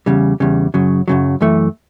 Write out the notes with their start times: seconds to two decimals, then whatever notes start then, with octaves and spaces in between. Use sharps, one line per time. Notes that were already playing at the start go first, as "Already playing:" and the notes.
0.06 E2 C#3 G3
0.40 E2 C#3 G3
0.74 F#2 C#3 F#3
1.08 F#2 C#3 F#3
1.41 F#2 E3 A3